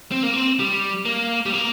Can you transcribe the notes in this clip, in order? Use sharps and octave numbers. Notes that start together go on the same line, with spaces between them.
C4
A#3
C4
G3
A#3
G3
A#3